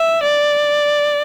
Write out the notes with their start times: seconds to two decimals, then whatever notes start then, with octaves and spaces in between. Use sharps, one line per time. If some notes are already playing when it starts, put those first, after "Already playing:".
Already playing: E5
0.23 D5